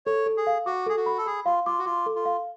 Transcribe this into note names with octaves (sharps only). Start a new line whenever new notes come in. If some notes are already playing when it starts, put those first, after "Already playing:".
A4 C#5
A4
G#4
F5
F#4 D6
G#4 A4
F#4
B5
A4
G#4 B5
F4 F5
F4 D6
F#4
F4 D6
A4
F4
F5